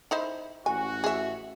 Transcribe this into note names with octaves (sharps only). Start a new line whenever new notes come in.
D#4 E4 C5
A1 F#4 G#5
G#4 E5